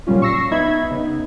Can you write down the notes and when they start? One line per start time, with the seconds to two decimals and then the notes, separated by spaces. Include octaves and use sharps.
0.07 A#2 C#3 F#3 G3 C#4 F4
0.22 C#6 E6 A#6 C7
0.51 B3 D#4 E5 B5 G#6
0.91 C#3 B3 D#4